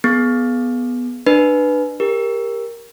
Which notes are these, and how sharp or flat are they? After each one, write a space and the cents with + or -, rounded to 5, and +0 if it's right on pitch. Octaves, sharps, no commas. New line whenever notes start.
B3 +0 G#4 +25
D4 +25 B4 +0
G4 +30 A#4 +5